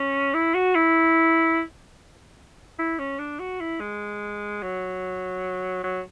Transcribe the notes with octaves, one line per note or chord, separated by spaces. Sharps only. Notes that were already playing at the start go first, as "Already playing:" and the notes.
Already playing: C#4
E4
F#4
E4
E4
C#4
D4
F#4
E4
G#3
F#3
F#3